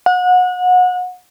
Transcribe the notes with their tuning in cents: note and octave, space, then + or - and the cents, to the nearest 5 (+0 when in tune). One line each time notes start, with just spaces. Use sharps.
F#5 -30